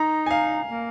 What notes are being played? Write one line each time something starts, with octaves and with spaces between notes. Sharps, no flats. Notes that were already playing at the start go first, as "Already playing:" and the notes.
Already playing: D#4 A#5
G#5
F5
A#3